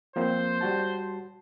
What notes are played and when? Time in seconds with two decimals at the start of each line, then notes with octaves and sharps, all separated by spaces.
0.16 F3 A#3 C4 C5
0.61 G3 F#4 A5